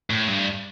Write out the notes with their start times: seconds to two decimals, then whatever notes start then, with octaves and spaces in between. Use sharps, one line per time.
0.10 A2
0.28 G2